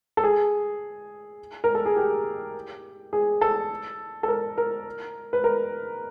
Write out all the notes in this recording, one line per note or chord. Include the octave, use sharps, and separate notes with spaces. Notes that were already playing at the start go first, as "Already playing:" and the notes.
A4
G#4
A#4
A4
G#4
G4
G#4
A4
A4
A#4
A#4
B4
A#4